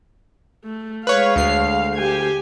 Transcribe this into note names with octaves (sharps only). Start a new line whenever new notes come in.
A3
G#3 B4 C#5 F5
D2 C7
G4 G#5